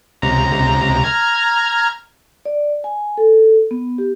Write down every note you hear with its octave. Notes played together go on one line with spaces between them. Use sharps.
C#2 C3 A#5
A#5 F6 G#6
D5
G#5
A4
B3
G4